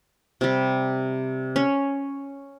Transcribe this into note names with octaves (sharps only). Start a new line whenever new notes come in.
C3 G3
C#4